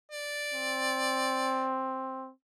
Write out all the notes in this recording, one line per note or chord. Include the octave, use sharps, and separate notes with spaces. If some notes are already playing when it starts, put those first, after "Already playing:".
D5
C4